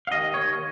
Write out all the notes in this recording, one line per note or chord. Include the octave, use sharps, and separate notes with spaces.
F5
D#2 D#5
D#2 C#5